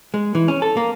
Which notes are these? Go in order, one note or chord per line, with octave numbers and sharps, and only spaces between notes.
G#3
E3
C#4
A4
A#3